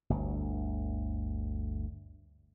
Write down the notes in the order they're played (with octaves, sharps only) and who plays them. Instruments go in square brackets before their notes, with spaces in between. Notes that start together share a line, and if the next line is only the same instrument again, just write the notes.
[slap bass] G1 D2